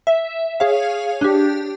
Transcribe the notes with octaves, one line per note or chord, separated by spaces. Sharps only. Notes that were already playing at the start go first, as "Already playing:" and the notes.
E5
G#4 C#5 F5
D4 G4